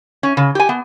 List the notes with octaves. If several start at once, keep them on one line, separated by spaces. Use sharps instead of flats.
C#4
C#3
G4 G#5
B3